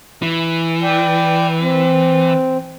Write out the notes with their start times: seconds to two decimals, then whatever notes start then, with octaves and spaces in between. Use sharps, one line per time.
0.22 E3
0.83 D5 G5
1.61 C4